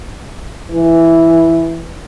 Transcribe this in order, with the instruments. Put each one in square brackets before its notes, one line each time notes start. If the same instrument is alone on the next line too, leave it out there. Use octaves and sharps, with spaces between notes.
[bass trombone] E3